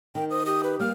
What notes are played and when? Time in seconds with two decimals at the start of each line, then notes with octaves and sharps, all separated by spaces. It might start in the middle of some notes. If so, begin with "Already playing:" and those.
0.15 D#3 G5
0.30 C5 D#6
0.46 G4 D#6
0.63 B4
0.80 G3 A#3 F6